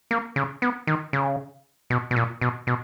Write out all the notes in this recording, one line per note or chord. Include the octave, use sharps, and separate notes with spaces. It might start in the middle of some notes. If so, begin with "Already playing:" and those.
A#3
C#3
B3
D#3
C#3
B2
B2
A#2
B2
B2